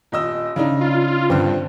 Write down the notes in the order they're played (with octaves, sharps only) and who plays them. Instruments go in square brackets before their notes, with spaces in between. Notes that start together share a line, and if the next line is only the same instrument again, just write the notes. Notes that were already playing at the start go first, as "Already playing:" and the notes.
[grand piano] D#1 D#5 E6
C#3 D4 D#4
[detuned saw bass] F4
[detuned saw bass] G2 [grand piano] D3 C4